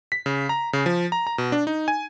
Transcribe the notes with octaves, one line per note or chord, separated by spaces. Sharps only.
B6
C#3
A#5
C#3
F3
A#5
A#5
B2
D4
D#4
G#5